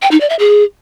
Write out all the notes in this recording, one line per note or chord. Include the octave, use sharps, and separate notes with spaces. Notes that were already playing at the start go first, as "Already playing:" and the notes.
G5
D#4
D5
E5
G#4